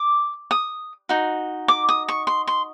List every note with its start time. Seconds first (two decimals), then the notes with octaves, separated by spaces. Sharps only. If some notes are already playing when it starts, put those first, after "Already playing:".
Already playing: D6
0.51 D#6
1.09 D#4 F#4
1.68 D6
1.89 D#6
2.08 C#6
2.27 C6
2.47 C6